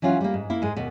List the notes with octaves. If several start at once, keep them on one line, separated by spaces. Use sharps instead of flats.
E3 F#3 C#4 F4 F#4
G3 A#3
G#2
A#3 E4
G#2 G#3
D#2 B2